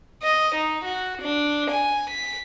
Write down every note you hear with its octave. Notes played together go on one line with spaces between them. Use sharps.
D#5
D#4
F#4
D4
G#5
B6